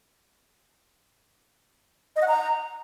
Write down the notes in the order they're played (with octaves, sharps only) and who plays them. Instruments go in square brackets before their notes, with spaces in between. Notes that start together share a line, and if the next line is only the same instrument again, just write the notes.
[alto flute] D#5
F#5
A#5